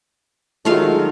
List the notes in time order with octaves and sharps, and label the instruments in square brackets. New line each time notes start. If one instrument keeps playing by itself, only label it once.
[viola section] D#3 F#3 G#3 [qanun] A3 F4 F5